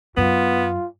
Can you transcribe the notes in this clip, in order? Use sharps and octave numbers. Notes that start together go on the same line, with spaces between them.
F#2 B3 F4